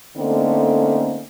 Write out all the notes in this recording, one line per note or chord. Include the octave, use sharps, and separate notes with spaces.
D3 A3 A#3 C4 C#4 D#4